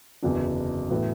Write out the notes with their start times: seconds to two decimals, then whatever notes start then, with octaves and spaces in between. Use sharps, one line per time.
0.22 F#1 E2 D3 F#3 D4
0.90 A2 E3 B3 F#4